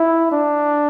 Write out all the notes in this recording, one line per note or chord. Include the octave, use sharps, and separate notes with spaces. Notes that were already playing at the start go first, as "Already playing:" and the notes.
Already playing: E4
D4